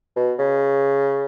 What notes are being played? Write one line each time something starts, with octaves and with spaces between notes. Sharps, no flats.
B2
C#3